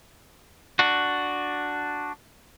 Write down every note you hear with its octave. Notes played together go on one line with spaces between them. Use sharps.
D4 F#4